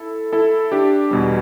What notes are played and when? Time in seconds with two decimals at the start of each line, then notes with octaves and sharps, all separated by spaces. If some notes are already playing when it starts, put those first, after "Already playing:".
Already playing: E4 A4
0.33 E4 A4
0.72 D4 G4
1.11 E2 B2 G3